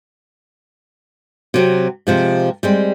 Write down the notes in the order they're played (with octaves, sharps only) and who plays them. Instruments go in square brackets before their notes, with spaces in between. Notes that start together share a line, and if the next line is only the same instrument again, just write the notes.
[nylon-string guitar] C3 F#3 C4
C3 F3 G#3
G3 G#3 C4